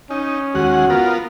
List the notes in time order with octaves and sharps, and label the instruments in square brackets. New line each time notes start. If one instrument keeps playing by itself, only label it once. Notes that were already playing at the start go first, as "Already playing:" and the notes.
[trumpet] C#4 [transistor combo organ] D#4
[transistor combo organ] D#2 G#3 F#5 [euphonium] F#4
[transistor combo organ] B3 F4 A#4